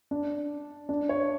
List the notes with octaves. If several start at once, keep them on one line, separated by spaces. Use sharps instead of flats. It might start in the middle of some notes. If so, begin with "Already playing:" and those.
D4
D4
C#5